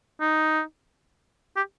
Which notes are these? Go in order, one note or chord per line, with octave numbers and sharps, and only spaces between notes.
D#4
G4